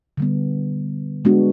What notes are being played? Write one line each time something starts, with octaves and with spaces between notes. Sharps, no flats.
D3 G3 B3
G#3 B3 D4 F#4